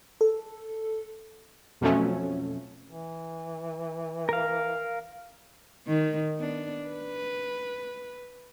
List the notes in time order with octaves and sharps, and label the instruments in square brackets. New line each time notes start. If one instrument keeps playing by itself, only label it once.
[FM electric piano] A4
[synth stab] F2 B2 F3 F#3 A3 C#4
[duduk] E3
[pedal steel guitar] A#4 F5
[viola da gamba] D#3
B3 D4
B4